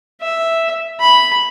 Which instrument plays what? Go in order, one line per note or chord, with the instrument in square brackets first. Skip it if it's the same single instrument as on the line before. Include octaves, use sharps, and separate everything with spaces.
[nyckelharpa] E5
B5